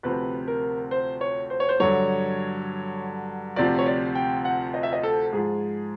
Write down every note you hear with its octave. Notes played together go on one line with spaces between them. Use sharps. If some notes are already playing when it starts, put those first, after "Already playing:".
D2 C3 F3 B4
A#4
C5
C#5
C5
C#5
C5
G2 D3 F#3 C#5
D2 C3 F3 D5
C#5
D5
G5
F#5
D#5
E5
D#5
A4
G#2 F3 G#4